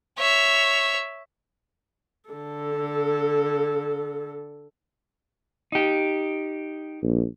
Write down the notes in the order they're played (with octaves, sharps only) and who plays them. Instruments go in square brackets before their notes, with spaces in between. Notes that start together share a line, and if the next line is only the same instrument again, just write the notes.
[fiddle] C#5 E5
[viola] D3 A4
[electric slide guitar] D#4 G4
[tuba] A#1